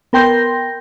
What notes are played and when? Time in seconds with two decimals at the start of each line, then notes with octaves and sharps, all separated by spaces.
0.13 B3 A#4 G5 C6 G6 A#6